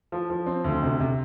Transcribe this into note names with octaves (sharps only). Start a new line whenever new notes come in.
F3
F3
C4
D2
C3
C3